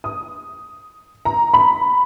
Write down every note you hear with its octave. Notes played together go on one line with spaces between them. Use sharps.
D#6
A#5
B5